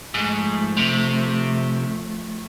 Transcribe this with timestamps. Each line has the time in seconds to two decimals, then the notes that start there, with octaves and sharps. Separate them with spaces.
0.14 G#2 F3 A3
0.77 C3